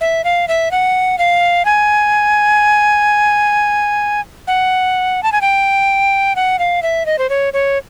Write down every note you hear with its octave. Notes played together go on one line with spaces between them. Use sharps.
E5
F5
E5
F#5
F5
G#5
F#5
A5
G#5
G5
F#5
F5
E5
D#5
C5
C#5
C#5